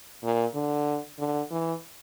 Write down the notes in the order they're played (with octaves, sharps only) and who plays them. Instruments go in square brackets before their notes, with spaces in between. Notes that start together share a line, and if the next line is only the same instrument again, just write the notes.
[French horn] A#2
D3
D3
E3